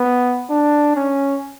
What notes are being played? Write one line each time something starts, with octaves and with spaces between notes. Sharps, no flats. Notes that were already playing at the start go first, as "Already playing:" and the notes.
Already playing: B3
D4
C#4